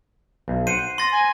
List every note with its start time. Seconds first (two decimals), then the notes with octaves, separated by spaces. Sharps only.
0.48 B1
0.67 C5 F#5 C7 D#7
0.98 C6 A6 A#6
1.11 G#5